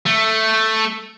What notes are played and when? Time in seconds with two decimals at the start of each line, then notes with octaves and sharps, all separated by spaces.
0.06 A3